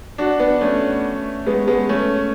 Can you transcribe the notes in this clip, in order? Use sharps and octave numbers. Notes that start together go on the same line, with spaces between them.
D4 F#4
B3 D4
A3 C#4
G#3 B3
G#3 B3
A3 C#4